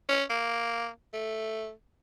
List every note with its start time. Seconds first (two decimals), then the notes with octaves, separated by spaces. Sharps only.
0.09 C#4
0.30 A#3
1.14 A3